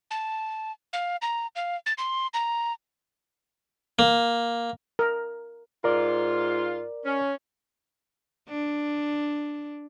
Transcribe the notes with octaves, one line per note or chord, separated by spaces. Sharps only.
A5
F5
A#5
F5
A6
C6
A#5
A#3
A#4
G#2 F4 A#4 D5
C#4
D4